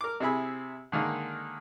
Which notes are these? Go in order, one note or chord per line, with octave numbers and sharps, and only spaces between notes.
A#4 D6
C3 E4 G#4 B5
D3 D#3 G#3 A#3